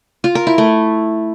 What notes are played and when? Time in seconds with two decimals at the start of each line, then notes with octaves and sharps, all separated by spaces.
0.24 F4
0.35 A#4
0.47 E4
0.58 A3